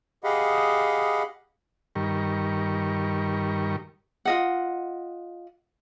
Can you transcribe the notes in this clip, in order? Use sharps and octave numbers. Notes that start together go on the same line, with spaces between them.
G4 G#4 D#5 F5 F#5 B5
G2 D#3 G3 A#4 C#6
F4 D#5 F#5